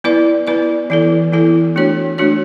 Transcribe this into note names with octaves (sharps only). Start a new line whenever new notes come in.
B3 E4 B4 D5
B3 E4 B4 D5
E3 B3 E4 A4
E3 B3 E4 A4
A3 D4 F#4 C#5
A3 D4 F#4 C#5